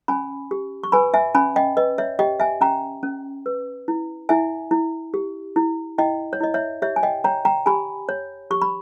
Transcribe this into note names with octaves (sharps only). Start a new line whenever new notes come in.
C#4 G#5 B5
G4
C#6
B4 G#5 B5
E5 G#5
C#4 G#5 B5
D#5 G5
B4 D#5
C#5 E5
G4 D#5 G5
E5 G#5
C#4 G5 A#5
C#4
B4
E4
E4 E5 G#5
E4
G4
E4
E4 D#5 G5
C#5
E4 D#5
C#5 E5
G4 C#5 E5
G#5
D#5 G5
C#5 G5 A#5
G5 A#5
G4 G#5 B5
C#5
G4 C#6
B5